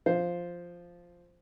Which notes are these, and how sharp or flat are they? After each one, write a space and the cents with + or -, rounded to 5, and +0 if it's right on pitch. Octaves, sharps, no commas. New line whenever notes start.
F3 +0 C5 +0